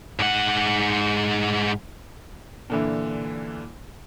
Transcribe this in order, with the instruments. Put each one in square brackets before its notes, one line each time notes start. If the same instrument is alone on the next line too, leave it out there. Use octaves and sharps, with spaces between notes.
[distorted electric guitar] G#2 F#5
[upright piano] A#2 D3 E3